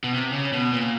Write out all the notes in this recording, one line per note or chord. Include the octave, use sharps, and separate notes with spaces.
B2
C3
C#3
B2
A#2